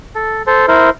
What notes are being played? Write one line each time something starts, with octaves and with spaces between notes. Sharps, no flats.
A4
A4 C5
E4 A#4 C5